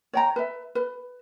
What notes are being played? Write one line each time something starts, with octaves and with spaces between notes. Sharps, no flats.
C#5 G5 A#5
B4 E5
B4